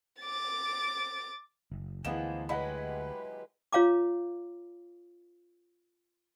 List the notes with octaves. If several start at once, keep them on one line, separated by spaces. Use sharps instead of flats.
D6 A6
F#1
D2 E3 F3 G#3 A#3 B3 G#4 E7
F#3 G#3 E4 G4 B4 F#5 B5
F4 C#5 F5 A#5 D6